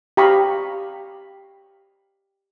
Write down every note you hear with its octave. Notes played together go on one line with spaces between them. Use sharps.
G4 F5 A#5 B5 C#6 D#6